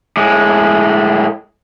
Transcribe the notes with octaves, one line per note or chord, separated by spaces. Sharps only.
A2 G#3